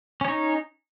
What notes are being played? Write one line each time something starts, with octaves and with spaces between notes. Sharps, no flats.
C#4 D#4 C#5